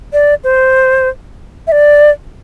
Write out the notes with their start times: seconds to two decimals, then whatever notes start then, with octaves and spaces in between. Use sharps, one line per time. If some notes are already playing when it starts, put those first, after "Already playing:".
0.13 D5
0.44 C5
1.67 E5
1.72 D5